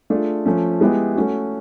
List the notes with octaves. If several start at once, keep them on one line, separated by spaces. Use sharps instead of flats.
A3 D4 F4 G#4
F3 A3 C#4
G#3 B3 E4 G4
A3 C#4 F#4